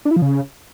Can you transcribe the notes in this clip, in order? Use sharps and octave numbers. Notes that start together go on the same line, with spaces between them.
D4
E4
F3
C#3